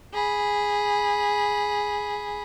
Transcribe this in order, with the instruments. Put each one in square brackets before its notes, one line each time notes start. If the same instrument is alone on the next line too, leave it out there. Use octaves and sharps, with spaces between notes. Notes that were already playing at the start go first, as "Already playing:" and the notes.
[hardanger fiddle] G#4 B5